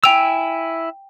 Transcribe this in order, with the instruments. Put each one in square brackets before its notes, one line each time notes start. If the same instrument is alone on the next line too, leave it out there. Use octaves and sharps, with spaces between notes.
[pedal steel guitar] E4 G#5 E6 [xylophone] G5 F7